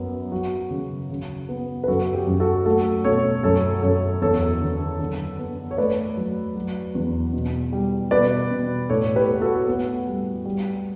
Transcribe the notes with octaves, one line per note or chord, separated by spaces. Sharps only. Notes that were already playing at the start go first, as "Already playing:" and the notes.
Already playing: F#2 B3
F#3 F#4
C#3
C#3
B3
B4
F#2 F#4 A4
G4
F#2
F#4 A4
A3 F#4 A4
B2 A4 C#5
F#2 A4 C#5
F#2 A4 C#5
E2 A4 C#5
D3
D3
B3
C#5
A3 B4 D5
F#3
F#3
E2
B2
G3
B2 B4 D5
B2
A2 A4 C#5
G4 B4
B3
F#4 A4
B3
G3
G3